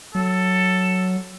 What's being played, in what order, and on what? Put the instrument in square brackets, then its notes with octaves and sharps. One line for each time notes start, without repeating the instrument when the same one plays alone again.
[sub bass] F#3 [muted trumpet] A4